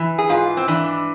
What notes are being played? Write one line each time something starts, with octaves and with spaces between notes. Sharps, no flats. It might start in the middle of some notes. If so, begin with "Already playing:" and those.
Already playing: E3
G#4
G#2 F4
C4
E3 D4